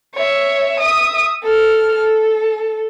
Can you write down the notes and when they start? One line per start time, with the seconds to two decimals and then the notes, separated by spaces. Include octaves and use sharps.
0.15 C#5 E5
0.80 E5 D#6
1.43 A4 F6
1.95 A4